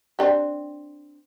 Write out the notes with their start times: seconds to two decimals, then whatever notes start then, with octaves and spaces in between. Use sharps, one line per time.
0.19 C4 D4 G4